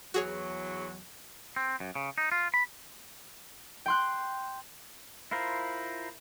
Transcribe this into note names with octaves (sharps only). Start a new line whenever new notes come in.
E2 F#3 F#4 G#4 C#5
C4
F#2
C#3
D#4
F4
B5
G5 C6 F#6
E4 F4 A#4 C5